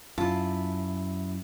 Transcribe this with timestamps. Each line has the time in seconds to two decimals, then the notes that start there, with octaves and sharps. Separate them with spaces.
0.18 F#2 E4 F4 A5